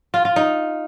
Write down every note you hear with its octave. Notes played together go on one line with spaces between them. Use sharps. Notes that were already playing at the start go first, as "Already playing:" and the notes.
F4
F4
D#4